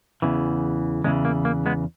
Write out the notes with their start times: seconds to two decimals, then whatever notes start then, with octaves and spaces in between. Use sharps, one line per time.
0.22 E2 C#3 E3
1.04 E2 C#3 E3 G#3
1.25 A#3
1.45 A#3
1.66 G#3 B3